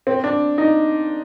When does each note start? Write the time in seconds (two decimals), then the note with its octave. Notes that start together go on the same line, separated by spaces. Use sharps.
0.07 C4
0.24 D4
0.58 D#4